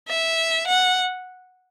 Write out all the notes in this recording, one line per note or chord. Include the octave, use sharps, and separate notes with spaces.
E5
F#5